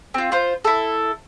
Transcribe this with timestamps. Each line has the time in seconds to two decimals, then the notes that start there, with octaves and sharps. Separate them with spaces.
0.14 C4 F4
0.32 F4 C5
0.64 E4 A4